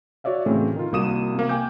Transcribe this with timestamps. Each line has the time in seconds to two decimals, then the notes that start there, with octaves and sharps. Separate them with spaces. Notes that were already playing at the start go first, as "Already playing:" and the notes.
0.24 F#4 C#5 D5 E5 F5
0.46 A2 C#3 E3 A3 C4
0.76 D#3 F4
0.92 C2 A#3 F#4 D#6 D#7 E7
1.35 C3 A#3
1.49 G5 G#5 D6 G6